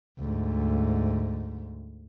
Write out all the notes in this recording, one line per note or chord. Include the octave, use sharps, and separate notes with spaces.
D2 G#2